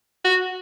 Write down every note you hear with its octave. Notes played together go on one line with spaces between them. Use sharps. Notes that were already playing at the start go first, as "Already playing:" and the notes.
F#4